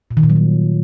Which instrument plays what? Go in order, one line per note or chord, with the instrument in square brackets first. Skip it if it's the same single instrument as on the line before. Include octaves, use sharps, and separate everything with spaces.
[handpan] A#2
D#3
A#2
F#3
G3